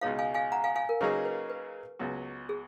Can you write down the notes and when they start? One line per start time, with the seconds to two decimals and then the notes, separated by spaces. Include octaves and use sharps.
0.01 C#2 B2 G#3 D#4 C#5 F5
0.19 F5 G#5
0.34 F5 G#5
0.52 F#5 A#5
0.64 F5 G#5
0.75 F5 G#5
0.89 A#4
1.01 C#3 F#3 A#3 D#4 G#4 B4
1.25 B4
1.50 B4
1.99 C#2 C#3 F#3 B3 F#4
2.49 G#4